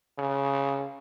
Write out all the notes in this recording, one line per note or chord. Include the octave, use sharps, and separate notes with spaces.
C#3